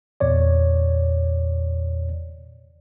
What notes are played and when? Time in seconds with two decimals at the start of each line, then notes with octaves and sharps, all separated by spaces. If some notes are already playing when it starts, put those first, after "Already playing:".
0.20 E2 A#2 C#5 D5